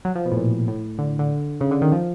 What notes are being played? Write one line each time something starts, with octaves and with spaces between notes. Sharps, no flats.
F#3
F3
B2
A2
A#2
A2
D3
D3
C#3
D3
D#3
F3